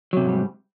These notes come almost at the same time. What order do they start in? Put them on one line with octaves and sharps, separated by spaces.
F#3 C3 F2 G#2 G3